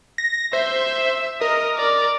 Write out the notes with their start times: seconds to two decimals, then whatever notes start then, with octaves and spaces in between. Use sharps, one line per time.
0.18 A#6
0.53 C5 E5
1.41 A#4 D#5
1.77 D5